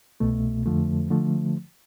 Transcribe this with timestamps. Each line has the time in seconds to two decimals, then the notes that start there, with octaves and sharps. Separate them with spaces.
0.20 C2 B2 A3
0.66 F2 D3 F3 A3
1.10 D3 F3 A3